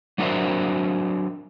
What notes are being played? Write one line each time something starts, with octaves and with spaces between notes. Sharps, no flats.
F#3 D4 F#4 A#4 C5 E5